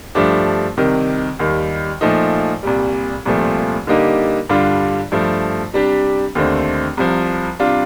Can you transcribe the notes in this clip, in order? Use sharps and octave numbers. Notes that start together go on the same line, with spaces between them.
G2 F3 A3 D4 G4
C2 C3 D#3
D#2 D#3 G3
A#2 F3 A3 D#4
C2 A#2 G3
C2 A#2 F3 A3
D3 G3 A#3 D#4 G4
G2 D3 G3 D4 F4
G2 F3 A3
C3 G3 D4 G4
D#2 D3 A3 C4
C2 C3 F3
C3 G3 D4 F4